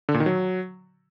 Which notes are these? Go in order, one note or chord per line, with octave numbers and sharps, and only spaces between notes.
D3
A#2
D#3
F#3